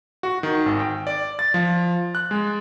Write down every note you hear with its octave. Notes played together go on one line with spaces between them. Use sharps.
F#4
D#3
G#1
G5
D5
A6
F3
F#6
G#3